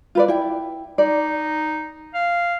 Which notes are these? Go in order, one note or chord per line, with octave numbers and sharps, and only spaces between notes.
F4 B4 D5
E4 G5
D#4 D5
F5